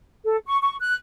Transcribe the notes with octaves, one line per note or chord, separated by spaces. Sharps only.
A4
C#6
C#6
F#6